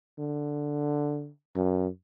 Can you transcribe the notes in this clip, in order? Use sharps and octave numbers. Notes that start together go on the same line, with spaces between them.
D3
F#2